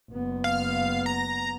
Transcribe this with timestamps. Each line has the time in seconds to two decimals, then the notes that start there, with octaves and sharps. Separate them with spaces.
0.11 F#1 B3
0.44 F5
1.06 A#5